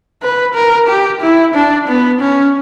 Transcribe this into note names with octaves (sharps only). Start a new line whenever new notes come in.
B4
A#4
G4
E4
D4
B3
C#4